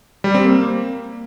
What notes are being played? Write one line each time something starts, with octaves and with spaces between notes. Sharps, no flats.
G3
C4
A#3